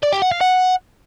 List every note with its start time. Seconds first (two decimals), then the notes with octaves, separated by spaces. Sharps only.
0.03 D5
0.13 G4
0.22 F#5
0.32 F5
0.41 F#5